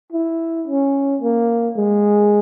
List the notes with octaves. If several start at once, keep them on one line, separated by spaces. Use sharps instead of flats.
E4
C#4
A#3
G#3